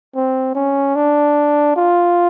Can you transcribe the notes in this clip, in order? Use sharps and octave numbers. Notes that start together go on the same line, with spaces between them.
C4
C#4
D4
F4